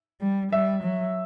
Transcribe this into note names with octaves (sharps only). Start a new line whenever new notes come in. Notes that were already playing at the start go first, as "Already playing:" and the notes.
G3
G3 E5
F#3